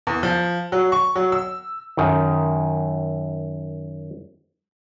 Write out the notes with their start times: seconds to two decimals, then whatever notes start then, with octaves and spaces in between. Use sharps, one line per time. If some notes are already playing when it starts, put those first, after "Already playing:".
0.07 E2
0.23 F3
0.72 F#3
0.92 C#6
1.15 F#3
1.32 E6
1.97 F#2 D#3